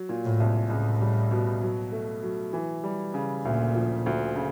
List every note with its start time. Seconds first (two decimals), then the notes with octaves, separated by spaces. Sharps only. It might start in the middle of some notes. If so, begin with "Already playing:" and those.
Already playing: F#3
0.09 A#2
0.25 A2
0.40 C2
0.70 C#2 A2
1.01 G3
1.31 B2
1.61 F#3
1.92 A3
2.23 F#3
2.53 E3
2.84 G3
3.14 C#3
3.45 D2 A#2
3.75 F3
4.06 D2
4.36 C#3